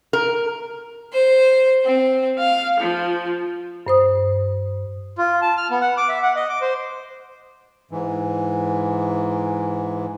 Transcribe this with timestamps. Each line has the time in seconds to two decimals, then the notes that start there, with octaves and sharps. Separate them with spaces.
0.13 A#4
1.13 C5
1.84 C4
2.38 F5
2.79 F3
3.87 G2 C5 D#6
5.18 F4
5.42 A5
5.57 F6
5.70 B3
5.81 F#5
5.97 D6
6.09 E5
6.23 F#5
6.36 D#5
6.49 D6
6.61 C5
7.91 G#2 E3